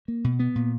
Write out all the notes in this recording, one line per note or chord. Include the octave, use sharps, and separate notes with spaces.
A#3
B2
B3
A#2